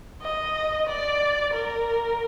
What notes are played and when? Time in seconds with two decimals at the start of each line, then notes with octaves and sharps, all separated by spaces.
0.21 D#5
0.87 D5
1.54 A#4